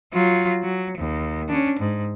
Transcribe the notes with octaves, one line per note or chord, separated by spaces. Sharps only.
F#3 F4
F#3
D#2
C#4 D4
G#2